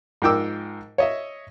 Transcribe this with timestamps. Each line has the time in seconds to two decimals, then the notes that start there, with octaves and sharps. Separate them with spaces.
0.22 G#2 F3 A#4 G5 D6 E6
0.98 C#5 D#5 E5